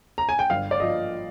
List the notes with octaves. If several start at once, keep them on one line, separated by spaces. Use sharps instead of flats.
A#5
G#5
G5
G1 F5
D5
F3 D#5